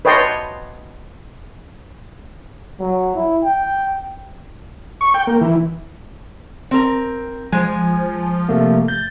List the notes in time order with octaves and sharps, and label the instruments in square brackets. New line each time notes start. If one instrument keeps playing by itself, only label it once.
[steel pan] B4 C#5 D#5 G5 A5 C6
[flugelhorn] F#3
E4
G5
[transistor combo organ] C#6
G5
A#3
E3
[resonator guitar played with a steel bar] C4 A#4
[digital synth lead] F3 [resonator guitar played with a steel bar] G#3 [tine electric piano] G#5
[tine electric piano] C3 A3 A#3
[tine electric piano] G6 [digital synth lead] A6